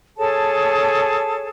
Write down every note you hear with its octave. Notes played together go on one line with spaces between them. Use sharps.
G#4 A4 C#5 A5